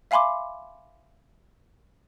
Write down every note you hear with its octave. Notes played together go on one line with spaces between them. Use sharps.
E5 F5 G#5 B5 C6 D6